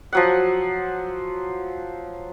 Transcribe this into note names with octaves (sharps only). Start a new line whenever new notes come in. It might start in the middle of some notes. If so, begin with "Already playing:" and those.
F3 F#3 F#5